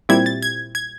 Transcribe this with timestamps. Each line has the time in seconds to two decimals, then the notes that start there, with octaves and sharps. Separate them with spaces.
0.09 A#2 G3 C4 E4 G#6
0.26 A6
0.42 G#6
0.75 G#6